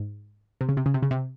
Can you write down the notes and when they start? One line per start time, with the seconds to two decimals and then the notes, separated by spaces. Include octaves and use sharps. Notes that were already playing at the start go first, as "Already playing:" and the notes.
Already playing: G#2
0.61 C3
0.69 C#3
0.77 C3
0.86 C#3
0.94 C3
1.03 C#3
1.11 C3